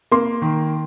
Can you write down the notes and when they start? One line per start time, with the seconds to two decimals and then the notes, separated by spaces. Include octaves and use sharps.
0.11 A#3 C6
0.42 D#3